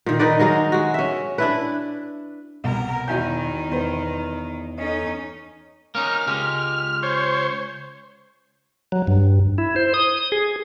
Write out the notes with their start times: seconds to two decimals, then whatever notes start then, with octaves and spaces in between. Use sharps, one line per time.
0.06 A#2 D#3
0.19 D#3 D#4 B4 D5
0.39 F#3 G#3 D#4 F5
0.72 G#3 F#4
0.94 C#4 E5
1.38 D4 E4 B4
2.64 C2 B2 A#4
3.07 E1 D#3 E4 F#4 E5 G#5 G6
3.72 E2 B4 C5
4.78 C#4 D#4 A4 C#5 D#5
5.95 A#3 C#4 D#4 F6
6.27 C#2 G#3 G4
7.03 C5 C#5
8.92 F#3
9.07 G2
9.58 E4
9.76 C5
9.94 D#6
10.32 G#4